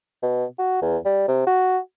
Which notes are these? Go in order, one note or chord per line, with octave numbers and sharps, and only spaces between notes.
B2
F#4
E2
G3
C3
F#4